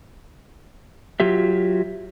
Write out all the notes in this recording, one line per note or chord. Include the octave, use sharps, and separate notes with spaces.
F#3 F4 G4 E5